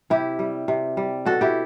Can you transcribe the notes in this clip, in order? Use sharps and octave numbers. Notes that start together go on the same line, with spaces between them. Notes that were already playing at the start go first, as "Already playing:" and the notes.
C3 E4 G4
G3
C3
G3
B2 F#4 A4
E4 G4